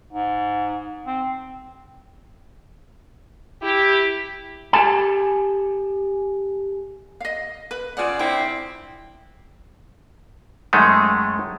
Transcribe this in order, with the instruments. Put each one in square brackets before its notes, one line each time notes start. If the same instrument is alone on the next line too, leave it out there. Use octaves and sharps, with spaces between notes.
[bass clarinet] G#2
C4
[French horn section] E4 G4
[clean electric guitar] G4 A4 G#5 A5
[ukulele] D#5 F5
B4
[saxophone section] C#3 D5 [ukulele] F4 F#5
[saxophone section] C4 D4 E4 [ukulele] G5
[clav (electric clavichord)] F#2 D#3 G#3 A3